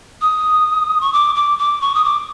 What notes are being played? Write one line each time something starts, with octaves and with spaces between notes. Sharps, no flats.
D#6
C#6
D6
D6
D6
C#6
D#6
D6